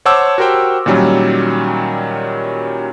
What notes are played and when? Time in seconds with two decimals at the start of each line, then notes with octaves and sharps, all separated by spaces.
0.05 C5 C#5 F#5 A5 D6 E6
0.38 F#4 G4 A#4 C5 G5
0.86 A#2 D#3 F#3 G3 C#4